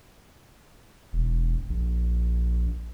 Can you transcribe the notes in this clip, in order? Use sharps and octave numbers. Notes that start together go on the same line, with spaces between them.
E1
A#1